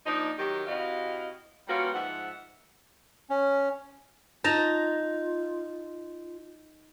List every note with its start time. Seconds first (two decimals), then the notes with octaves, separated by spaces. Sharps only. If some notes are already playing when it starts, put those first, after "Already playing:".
0.06 F3 A#3 D4 D#4
0.38 D#3 F#3 G4
0.67 C3 E4 F#4 D#5 F5
1.68 G3 A#3 C#4 F4 F#4 B4
1.93 G#2 F3 E5 F#5
3.30 C#4
4.44 D#4 F4 A5 A#5